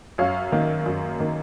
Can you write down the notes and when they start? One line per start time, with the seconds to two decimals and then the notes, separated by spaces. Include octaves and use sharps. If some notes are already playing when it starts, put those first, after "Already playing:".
0.18 F#2 C#5 F5
0.52 D#3 A#3
0.86 F#2
1.20 D#3 A#3